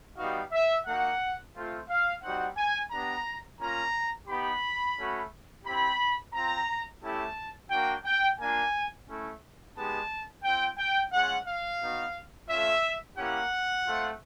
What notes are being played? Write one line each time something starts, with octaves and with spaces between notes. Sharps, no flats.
G3 B3 D#4 F#4 F5
E5
A#3 D#4 F#4 F#5
A3 C4 F4
F5
G3 C4 D#4 F#4 F#5
G#5
B3 D4 G4 A#5
A#3 C#4 F4 A#5
B3 D#4 G4 B5
A3 C#4 F#4
C4 E4 G4 B5
C4 F4 A#5
A3 C#4 E4 G4 A5
A#3 D4 F#4 G5
G5
A#3 D4 F4 G#5
A3 C#4 E4
G#3 B3 D#4 G4 A5
C4 F4 G5
G5
G#3 C#4 F4 F#5
F5
B3 D#4 F#4
A3 C#4 F4 E5
A#3 C#4 E4 G4 F#5
A3 C4 F4